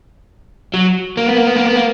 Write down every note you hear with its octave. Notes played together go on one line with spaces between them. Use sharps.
F#3
A#3
B3
A#3
B3
A#3
B3
A#3